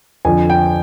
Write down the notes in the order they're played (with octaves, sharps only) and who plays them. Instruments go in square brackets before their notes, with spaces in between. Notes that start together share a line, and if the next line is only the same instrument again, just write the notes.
[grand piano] F2 D3 F3 G#5
G5